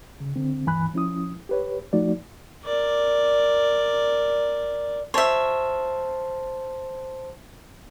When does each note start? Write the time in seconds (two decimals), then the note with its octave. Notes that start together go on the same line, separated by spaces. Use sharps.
0.20 C#3
0.36 D3 C4
0.66 D2 G2 E3 G#5 B5 F#6
0.94 F3 C#4 E4 D#6
1.49 G4 B4 C#5
1.93 F3 A3 D#4 F#4 D5
2.64 A#4 D5
5.14 C5 C#5 E5 A5 C6